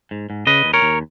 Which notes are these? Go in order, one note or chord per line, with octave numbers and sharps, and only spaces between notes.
G#2
G#2
C#3 B4 D#5
D#2
A#4 C#5
D#2